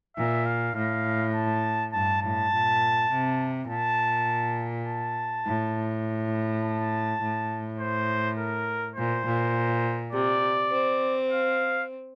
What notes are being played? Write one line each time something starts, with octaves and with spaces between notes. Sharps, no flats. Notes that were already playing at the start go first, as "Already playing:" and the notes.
A#2 E5
F5
A2 F5
A5
G2 A5
A2 A5
A#2
C3
A#2 A5
A5
A2
A5
A2
C5
A#4
A#2 C5
A#2
C3 D5
C4
F5